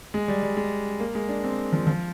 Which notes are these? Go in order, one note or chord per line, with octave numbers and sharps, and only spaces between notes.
G#3
G3
G3
G#3
A#3
G#3
D4
C4
F3
F3